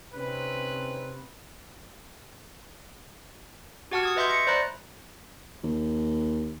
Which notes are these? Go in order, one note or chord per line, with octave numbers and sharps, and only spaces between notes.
C3 C4 C#4 D#4 B4
F#4 G4 F#5 A5 C#6 F6
C#6 D#6 G#6
B4 D#5 E5 C6 C#6 G6
A#6 C#7
C5 D5 A#5 B5 F#6 A#6
D#2